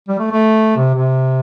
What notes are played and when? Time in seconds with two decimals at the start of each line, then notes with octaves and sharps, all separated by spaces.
0.08 G3
0.19 A3
0.31 A3
0.77 C3
0.94 C3